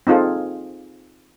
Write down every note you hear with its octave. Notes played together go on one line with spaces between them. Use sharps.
C4 D#4 F4 G#4 A4